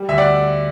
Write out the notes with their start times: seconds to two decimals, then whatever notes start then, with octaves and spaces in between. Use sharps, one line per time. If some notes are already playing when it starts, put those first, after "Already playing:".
Already playing: G3
0.09 D2 E5
0.18 D5 F#5